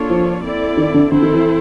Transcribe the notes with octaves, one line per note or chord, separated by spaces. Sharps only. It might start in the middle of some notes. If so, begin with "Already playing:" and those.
Already playing: A#3 D4 F4 A4 C#5
F3
C4 E4 A4 D5
D#3
D3
D3 C4 E4 A4 C5
D#3
E3